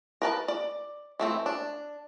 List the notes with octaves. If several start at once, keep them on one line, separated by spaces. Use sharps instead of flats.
A#4 B4 A5
D5
E3 A3 C4
D4